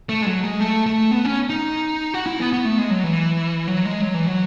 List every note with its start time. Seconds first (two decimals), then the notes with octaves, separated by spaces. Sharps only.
0.09 A3
0.22 G#3
0.26 F#3
0.43 G#3
0.60 A3
0.86 A3
1.11 B3
1.25 C#4
1.50 D#4
2.14 F#4
2.27 E4
2.40 B3
2.53 B3
2.65 A3
2.78 G#3
2.90 F#3
3.04 E3
3.67 F#3
3.85 G#3
4.01 F#3
4.14 E3
4.27 F#3